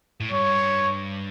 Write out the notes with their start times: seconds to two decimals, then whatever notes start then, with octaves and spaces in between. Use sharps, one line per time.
0.21 A2
0.31 G2 C#5